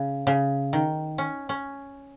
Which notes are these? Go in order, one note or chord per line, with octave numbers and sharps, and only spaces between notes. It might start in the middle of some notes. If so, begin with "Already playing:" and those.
Already playing: C#3
C#3
D#3
C#4
C#4